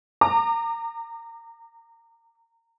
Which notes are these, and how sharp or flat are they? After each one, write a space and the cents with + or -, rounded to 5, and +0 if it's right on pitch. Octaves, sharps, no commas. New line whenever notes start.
A#5 -25 D6 +35